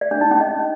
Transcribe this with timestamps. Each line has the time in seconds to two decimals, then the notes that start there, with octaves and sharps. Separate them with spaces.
0.01 D5
0.11 D4
0.21 D#4
0.31 C#4
0.41 D#5